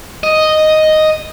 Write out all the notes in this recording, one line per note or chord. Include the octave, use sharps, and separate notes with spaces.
D#5